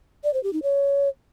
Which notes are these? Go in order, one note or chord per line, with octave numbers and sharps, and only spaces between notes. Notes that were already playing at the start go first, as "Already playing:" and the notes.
D5
C5
G4
D#4
C#5